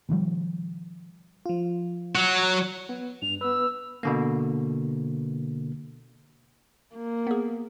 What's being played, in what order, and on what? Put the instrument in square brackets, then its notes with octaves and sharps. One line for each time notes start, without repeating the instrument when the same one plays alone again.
[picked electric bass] B2 D#3 F3 G3
[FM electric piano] F3 F4
[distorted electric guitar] F#3 F#4
[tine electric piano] B3
[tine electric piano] G2 [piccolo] F7
[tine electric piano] B3 B4 [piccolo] E6
[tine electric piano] B2 D3 A#3
[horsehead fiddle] A#3
[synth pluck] B3 G#4